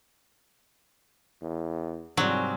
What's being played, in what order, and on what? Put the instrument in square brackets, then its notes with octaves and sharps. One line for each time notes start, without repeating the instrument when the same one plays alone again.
[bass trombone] E2
[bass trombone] F2 [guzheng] G#2 C3 G3 [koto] F#3